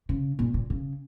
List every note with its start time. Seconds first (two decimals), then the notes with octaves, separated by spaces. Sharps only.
0.09 C#3
0.39 A#2
0.54 A#2
0.70 C#3